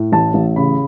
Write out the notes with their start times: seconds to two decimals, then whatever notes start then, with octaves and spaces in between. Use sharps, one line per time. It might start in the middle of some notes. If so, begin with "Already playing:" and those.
Already playing: A2
0.12 A1 A5
0.34 A1
0.56 C#3 B5